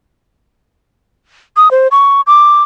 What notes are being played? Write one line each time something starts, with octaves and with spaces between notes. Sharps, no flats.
D#6
C5
C#6
D6